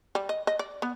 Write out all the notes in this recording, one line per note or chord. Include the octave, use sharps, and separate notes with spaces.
G3
D#5
D#5
D5
B3